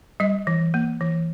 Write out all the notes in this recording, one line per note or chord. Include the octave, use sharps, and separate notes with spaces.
G3 D#5
E3
A#3
E3